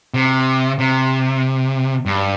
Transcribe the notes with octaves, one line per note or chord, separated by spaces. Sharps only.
C3
C3
G2